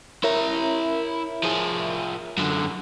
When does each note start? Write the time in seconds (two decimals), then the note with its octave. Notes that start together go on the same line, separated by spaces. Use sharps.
0.24 E4 A#4 C#5 E5 A#5
1.43 F3 G#4
2.37 F#2 D3